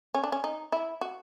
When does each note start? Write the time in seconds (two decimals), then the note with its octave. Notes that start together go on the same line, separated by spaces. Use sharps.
0.15 C#4
0.24 D4
0.32 C#4
0.44 D#4
0.72 E4
1.01 F#4